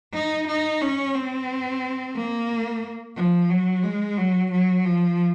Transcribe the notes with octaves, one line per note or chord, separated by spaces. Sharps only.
D#4
D#4
C#4
C4
A#3
F3
F#3
G#3
F#3
F#3
F3